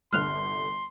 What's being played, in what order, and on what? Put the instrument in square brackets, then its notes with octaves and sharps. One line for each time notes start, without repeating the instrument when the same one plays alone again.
[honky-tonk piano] G1 C2 D3 [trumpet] C6 [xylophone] F6 F#6 F7